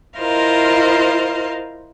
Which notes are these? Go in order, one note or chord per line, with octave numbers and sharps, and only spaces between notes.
E4 F4 A#4 C5 D#5 F5